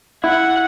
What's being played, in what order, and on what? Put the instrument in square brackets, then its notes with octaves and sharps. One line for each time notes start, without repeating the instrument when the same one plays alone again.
[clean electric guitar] E4 [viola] F#5